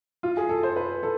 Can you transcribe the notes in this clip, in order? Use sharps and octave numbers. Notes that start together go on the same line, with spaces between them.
F4
G#4
A4
C5
B4
A4